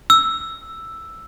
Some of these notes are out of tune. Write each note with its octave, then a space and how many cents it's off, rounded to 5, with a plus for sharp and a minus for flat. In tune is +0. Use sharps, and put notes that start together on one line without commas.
E6 +5